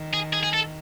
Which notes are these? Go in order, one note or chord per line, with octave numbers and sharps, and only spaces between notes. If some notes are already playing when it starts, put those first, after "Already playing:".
Already playing: D#3
G#4
G#4
G#4
A4